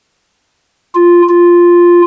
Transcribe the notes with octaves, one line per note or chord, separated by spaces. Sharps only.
F4
F4